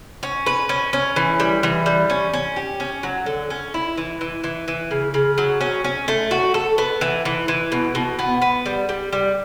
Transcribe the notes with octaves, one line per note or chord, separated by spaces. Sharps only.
C#4
B4
C#4
C#4
E3
G3
E3
G3
C#4
C#4
G4
C#4
F#3
D3
C#4
E4
E3
E3
E3
E3
C#3
C#3
F#3
C#4
C#4
A3
F#4
A4
B3
E3
E3
E3
B2
B2
B3
B3
G3
G3
G3